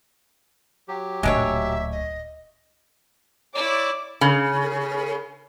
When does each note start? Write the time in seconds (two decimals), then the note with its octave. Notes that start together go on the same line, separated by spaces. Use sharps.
0.88 F#3 G4
1.23 D1 A#2 G#3 D4 C#5 E5
1.92 D#5
3.55 E4 C#5 D5 D6
4.21 C#3